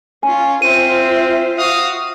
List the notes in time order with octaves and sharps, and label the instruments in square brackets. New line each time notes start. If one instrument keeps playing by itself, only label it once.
[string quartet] C#4 F4 [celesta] G#5
[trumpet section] C4 [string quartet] F4 C5 E5 [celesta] D#7
[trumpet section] F#4 F5 D#6